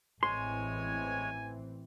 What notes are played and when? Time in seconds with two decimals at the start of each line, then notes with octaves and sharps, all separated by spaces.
0.23 A1 E3 G#3 C4 C#5 G#5 C6